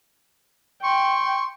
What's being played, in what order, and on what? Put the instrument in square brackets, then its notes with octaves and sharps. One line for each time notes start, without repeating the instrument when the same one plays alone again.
[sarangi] G5 [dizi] C6 [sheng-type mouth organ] C#6